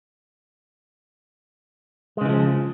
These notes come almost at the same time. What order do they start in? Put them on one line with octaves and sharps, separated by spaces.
G#3 C#3 E3 F3